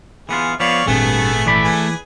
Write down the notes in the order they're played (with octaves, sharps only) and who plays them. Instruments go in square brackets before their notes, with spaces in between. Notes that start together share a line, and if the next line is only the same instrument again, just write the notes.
[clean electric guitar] E3 B3 F4 [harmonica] G#4
[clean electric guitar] F3 B3 [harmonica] C#5 D5 F5
[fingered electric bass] G#1 A#2 C4 [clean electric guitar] G2 [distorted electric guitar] A3 [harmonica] B3 G#4
[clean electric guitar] E3 D5 B5
[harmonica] G#4 B4 G#5